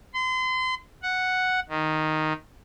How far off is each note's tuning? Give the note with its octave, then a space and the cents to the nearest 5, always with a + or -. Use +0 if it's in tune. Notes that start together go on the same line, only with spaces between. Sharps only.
C6 -35
F#5 +0
D#3 +0